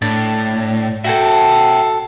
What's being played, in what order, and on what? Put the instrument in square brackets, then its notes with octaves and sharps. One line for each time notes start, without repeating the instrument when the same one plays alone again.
[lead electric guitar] A2 [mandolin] D4
[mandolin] F#4 A4 [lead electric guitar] E5 G5